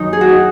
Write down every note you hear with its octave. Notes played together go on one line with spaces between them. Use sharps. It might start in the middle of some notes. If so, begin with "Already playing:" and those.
Already playing: F#2 D#3 F#3 D#4
G#4
F#4
D#4